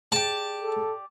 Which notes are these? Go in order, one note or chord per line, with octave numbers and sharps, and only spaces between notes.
G4 G#4 D5 A5
A4